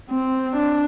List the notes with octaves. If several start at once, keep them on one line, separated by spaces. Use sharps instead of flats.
C4
D4